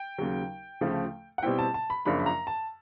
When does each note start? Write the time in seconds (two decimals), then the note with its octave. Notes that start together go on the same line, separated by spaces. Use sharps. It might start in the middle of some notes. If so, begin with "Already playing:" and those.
Already playing: G5
0.18 D#2 C#3 F#3
0.81 D2 C#3 F3 A3
1.38 F#5
1.42 B2 G3 C4 E4 G5
1.59 A5
1.74 A5
1.90 B5
2.05 F#2 C#3 F3 A#3 D4 B5
2.19 B5
2.26 A#5
2.47 A5